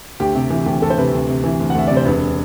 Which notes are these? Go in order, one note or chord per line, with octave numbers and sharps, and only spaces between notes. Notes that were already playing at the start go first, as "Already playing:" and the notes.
D2 G4
C3
E3
D2 G4
D2 A4
C5
C3 B4
D2
C3
E3
D2
F#5
D2 E5
C3 D5
C5
E1 B4